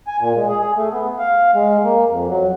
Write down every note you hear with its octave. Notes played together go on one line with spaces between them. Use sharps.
G#5
A#2
G#3
G#4
G#4
A3
B3
F5
G#3
A#3
F2
F#3